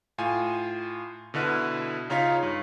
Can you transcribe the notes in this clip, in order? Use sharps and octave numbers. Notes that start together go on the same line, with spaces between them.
A2 F4 G#5
B2 D3 E4 B4 F6
C#3 D#4 F4 C#5 F5 B6
G2